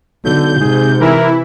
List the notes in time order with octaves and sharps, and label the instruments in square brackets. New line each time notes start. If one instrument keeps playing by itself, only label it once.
[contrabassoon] B1 [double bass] D3 [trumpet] A4 [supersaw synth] G6
[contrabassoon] G#2 [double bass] C3 [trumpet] G#4
[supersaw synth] E3 E4 [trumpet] A#4